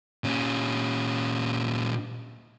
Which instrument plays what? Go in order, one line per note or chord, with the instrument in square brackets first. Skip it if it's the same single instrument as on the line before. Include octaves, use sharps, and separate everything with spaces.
[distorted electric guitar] A#2 C#4